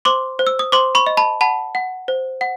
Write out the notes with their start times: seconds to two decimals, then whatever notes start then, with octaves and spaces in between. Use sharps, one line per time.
0.05 C5 C6 D6
0.39 C5
0.47 E6
0.59 D#6
0.72 C5 C6 D6
0.95 B5 C#6
1.07 D#5
1.17 A5 B5
1.41 F#5 A5 B5
1.75 F#5
2.08 C5
2.41 F#5